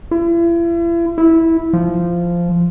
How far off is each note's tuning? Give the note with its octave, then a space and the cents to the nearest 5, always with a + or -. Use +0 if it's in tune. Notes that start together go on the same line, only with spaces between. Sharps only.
E4 +40
E4 -10
F3 -10